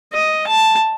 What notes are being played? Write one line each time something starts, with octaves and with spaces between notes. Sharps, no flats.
D#5
A5